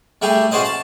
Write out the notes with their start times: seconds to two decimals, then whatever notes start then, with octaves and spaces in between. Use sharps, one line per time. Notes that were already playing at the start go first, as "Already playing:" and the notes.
0.22 G3 A3 G4 G#4
0.51 C#4 F#4 G#4 C5 D5 D#5
0.65 A5